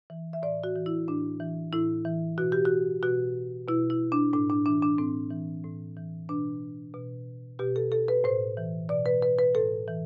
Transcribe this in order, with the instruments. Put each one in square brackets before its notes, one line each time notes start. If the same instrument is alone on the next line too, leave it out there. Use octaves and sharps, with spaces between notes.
[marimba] E3
E5
A2 D5
F#4
E3
E4
A2 D4
E3
A2 E4
E3
B2 F#4
G4
F#4
B2 F#4
B2 E4
E4
D4
A2 D4
D4
E3 D4
D4
A2 C4
E3
A2
E3
B2 D4
B2
B2 G4
A4
A4
B4
A2 C5
E3
B2 D5
B4
B4
B4
A2 A4
E3